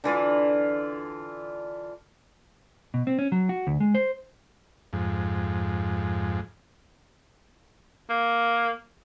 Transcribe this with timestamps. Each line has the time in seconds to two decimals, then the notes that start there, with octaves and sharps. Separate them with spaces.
0.04 D3 E3 F4 B5
2.94 B2
3.07 C4
3.19 C#4
3.32 F#3
3.49 F#4
3.67 D2
3.80 G#3
3.95 C5
4.93 F2 G#2
8.09 A#3